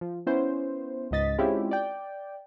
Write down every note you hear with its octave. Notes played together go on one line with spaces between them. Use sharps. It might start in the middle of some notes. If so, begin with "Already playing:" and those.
F3
B3 C#4 E4 C5
C#2 G#2 D#5 A6 B6
G#3 C4 C#4 E4 F4 G4
D5 G5